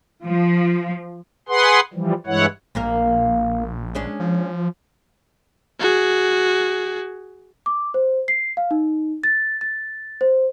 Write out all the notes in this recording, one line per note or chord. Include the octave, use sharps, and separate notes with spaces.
F3
G#4 B4 F#5 C6
E3 F3 G3
G2 E3 G#3 E4 C#5 F#5
A#1 A#2 A#3 A#4
G#3 C#4 D4
F3
F#4 G#4
D6
C5
C7
F5
D#4
A6
A6
C5